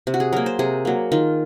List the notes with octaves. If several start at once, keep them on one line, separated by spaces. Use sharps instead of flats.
C3
F#4
G#4
F#3 A#3 A#4
C5
C3 G#4
F#3 A#3
D#3 F4